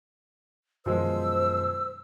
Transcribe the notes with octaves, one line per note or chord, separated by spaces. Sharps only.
F#2 B2 D#3 F3 G#3 C5 E6